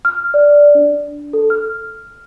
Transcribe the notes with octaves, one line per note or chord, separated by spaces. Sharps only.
F6
D5
D4
A4
F6